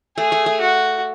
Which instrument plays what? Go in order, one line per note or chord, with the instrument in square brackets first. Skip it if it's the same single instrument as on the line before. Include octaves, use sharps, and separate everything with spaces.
[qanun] A3 [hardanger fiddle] G#4
[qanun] A3
A3
[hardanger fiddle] F#4